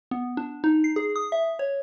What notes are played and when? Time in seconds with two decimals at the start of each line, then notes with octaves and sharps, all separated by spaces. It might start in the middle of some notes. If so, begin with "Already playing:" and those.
0.11 B3
0.37 D4
0.64 D#4
0.84 C7
0.96 G#4
1.16 D#6
1.32 E5
1.59 C#5